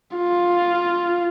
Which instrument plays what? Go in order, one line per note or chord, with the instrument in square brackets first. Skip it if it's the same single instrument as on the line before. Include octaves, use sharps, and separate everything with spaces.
[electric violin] F4